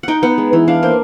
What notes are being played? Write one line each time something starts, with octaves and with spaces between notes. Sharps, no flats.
D#4 F#5 G5
B3 F#5
G#3
E3
D4 F5
A#3 C5